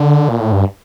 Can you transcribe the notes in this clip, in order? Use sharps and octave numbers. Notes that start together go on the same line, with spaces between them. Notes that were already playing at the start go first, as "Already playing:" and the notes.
Already playing: D3
A#2
A2
G2